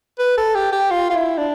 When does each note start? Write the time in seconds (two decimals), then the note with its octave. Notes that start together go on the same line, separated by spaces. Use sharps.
0.19 B4
0.38 A4
0.55 G4
0.72 G4
0.91 F4
1.10 F4
1.13 E4
1.38 D4